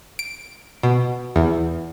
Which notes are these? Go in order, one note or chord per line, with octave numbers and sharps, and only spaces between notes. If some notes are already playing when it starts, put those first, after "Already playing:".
D7
B2
E2